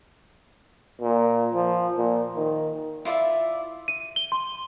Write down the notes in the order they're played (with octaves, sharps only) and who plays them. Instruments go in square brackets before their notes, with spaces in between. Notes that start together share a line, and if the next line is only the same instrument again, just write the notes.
[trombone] A#2
F3
A#2
D#3
[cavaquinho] E4 F4 D5 E5
[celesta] D#7
G7
C6